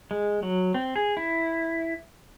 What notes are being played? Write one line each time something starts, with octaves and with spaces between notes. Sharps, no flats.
G#3
F#3
C4
G#4
E4